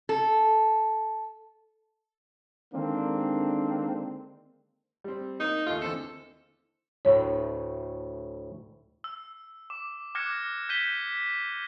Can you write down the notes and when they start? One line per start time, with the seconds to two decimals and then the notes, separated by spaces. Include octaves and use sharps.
0.09 A4
2.74 D3 D#3 G#3 A#3 C4 D4
5.04 G3 C4
5.40 A#3 D#4
5.66 D#2 A3 F4
5.81 D3 E3 C4 A4
7.05 D2 A2 C#5
9.04 E6
9.70 D6
10.15 D6 F6 F#6 G#6 A#6 C#7
10.69 G6 B6 D#7 G7